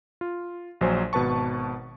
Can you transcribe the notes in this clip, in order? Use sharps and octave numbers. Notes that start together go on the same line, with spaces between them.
F4
A#1 F#3 C5 G#5
G#1 B2 B4 A5 C#6